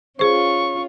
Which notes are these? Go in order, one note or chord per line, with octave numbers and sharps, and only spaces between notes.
C#4 F4 G#4 C5 C#6